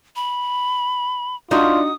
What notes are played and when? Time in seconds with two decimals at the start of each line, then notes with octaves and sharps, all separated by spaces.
0.16 B5
1.51 D4 D#4 F4 F#4 D#6